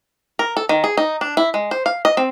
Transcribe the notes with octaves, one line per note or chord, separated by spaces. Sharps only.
A#4
A4
D#3
G#4
D#4
D4
E4
G#3
C5
F5
D#5
C4